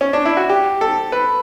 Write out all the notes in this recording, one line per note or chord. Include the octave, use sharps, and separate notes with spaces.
C#4
D4
E4
F#4
G4
A4
B4